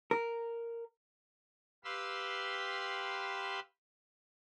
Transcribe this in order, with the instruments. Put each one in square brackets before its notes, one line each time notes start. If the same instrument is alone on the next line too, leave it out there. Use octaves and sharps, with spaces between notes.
[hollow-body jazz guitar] A#4
[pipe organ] G4 B4 F5 B5 C6 E6